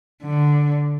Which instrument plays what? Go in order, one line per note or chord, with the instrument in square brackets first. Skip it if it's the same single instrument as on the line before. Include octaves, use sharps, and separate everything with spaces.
[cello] D3